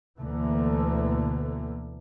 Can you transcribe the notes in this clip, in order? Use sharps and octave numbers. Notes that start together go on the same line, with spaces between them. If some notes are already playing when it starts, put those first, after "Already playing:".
D2 B2 D3 E3 A3 A#3